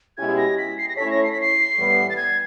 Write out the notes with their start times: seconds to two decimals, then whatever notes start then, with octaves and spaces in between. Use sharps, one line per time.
0.17 B2 G#3 C#4 E4 G4 G#6
0.37 A#6
0.58 B6
0.78 C7
0.88 A#6
0.96 A3 C#4 E4 A4 C#5 B6
1.11 A#6
1.23 C7
1.32 B6
1.41 C7
1.77 A2 E3 G3 B3
2.10 A6
2.16 G#6